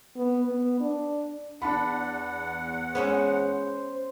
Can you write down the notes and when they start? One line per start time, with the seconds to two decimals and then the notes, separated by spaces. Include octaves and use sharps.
0.16 B3
0.45 B3
0.80 D4
1.62 E2 D4 F#5 A5 B5
2.95 G#3 B3 C#4 C5 E5